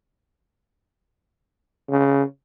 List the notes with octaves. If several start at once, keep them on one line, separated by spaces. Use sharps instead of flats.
C#3